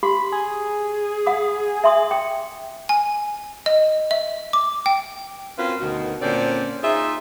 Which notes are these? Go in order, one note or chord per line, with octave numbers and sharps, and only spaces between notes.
F#4 G4 B5
G#4
F#5 D#6
E5 C6 D#6
G5
G#5
D#5
E5
D6
G5
C4 C#4 F4 F#4 A#4 B4
D2 B2 D#3 F#4
A#2 D3 C4 C#4 C5 D5
D#4 F4 G#4 E5